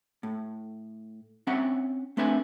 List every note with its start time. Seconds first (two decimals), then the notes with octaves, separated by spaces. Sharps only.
0.23 A2
1.47 C4 C#4 E5 F#5 G5 A#5
2.17 A3 C4 D4 B4 E5 G#5